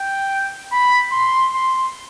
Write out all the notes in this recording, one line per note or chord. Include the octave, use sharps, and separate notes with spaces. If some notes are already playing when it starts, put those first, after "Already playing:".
Already playing: G5
B5
C6
C6